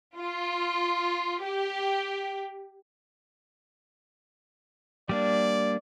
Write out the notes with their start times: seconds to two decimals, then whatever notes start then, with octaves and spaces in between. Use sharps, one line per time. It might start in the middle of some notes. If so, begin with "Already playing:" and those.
0.17 F4
1.43 G4
5.09 G3 A#3 D4 D5